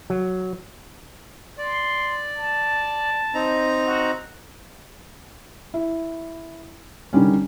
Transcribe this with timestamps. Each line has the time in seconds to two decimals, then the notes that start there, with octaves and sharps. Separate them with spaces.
0.10 F#3
1.58 D5 C6
2.36 A5
3.34 C4 D#4 A#5
3.86 F#4
5.74 E4
7.13 D3 D#3 G3 C#4